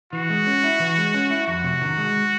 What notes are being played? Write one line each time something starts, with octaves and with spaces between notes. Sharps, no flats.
E3 F#4
G#3
C#4
E4
E3
G#3
C#4
E4
F2 F#4
C3
D#3
G#3